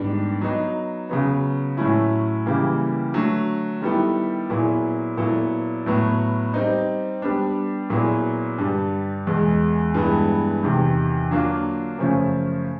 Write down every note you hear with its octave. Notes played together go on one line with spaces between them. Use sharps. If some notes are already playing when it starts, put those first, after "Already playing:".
Already playing: G#2 D#3 G3 B3 D4
F#3 B3 D#4
C#3 F#3 B3
A2 F#3 A3 C#4 E4
C#3 E3 G3 A#3
D3 F#3 A3
D#3 G3 B3 E4 A4
A#2 F#3 B3 E4 G#4
A#2 F#3 B3 E4 A4
A2 F#3 B3
G3 C4 D#4
G3 B3 D4
A#2 F#3 B3 E4 G#4
G2 D3 G3
E2 B2 G#3
G2 E3 G#3 B3
E2 C3 D#3
D3 F#3 A#3 D4 F4
F#2 C#3 F3 A3 C#4